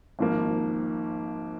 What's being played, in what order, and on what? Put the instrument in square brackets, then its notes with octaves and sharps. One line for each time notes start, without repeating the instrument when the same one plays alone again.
[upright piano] G#1 G#2 F3 A#3